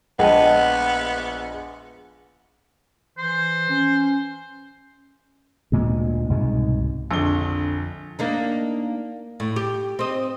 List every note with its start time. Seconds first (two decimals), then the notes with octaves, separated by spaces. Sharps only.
0.19 A#1 G#3 B3 D#5 F#5 G5 A5
3.18 E3 C5
3.69 C#4
5.72 D2 A#2 G#3
6.30 C2 G#2 B2 G#3
7.11 A#1 F2 D3 G7
8.19 A#3 D4 D#4
9.40 A2
9.56 G4
9.99 C4 D#5